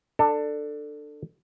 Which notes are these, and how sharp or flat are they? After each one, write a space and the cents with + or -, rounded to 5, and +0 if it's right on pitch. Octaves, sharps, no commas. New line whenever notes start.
D4 +20 A4 +20